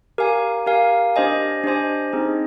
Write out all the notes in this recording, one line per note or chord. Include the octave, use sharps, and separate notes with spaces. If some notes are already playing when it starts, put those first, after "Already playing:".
G4 A#4 F5 G#5
G4 A#4 F5 G#5
D4 G4 C5 D#5 G#5
D4 G4 C5 D#5 G#5
C4 D#4 G#4 D#5